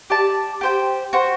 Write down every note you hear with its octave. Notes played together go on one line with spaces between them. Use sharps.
G4 D5 A5
G4 C5 G5
F#4 C5 G5